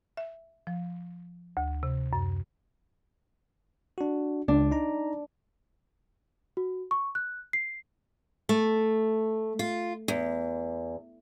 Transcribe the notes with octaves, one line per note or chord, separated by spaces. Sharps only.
E5
F3
D2
C3
F#2
D4 F#4
C#2 D4
D#4 A#5
F#4
C#6
F#6
C7
A3
F4
E2